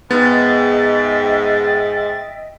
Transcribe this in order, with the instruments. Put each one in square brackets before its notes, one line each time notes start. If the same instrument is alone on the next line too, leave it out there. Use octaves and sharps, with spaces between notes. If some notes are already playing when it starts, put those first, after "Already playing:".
[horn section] G#2 [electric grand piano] B3 [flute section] D#5 E5 G5 [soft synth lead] A6